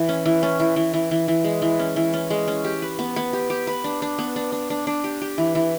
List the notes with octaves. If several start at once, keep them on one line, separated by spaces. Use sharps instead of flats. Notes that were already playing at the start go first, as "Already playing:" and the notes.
Already playing: E3
C#4
E3
C#4
E3
E3
E3
E3
E3
G#3
E3
C#4
E3
C#4
G#3
C#4
G4
B4
B3
B3
G4
G4
B4
D4
D4
B3
D4
D4
D4
D4
G4
G4
E3
E3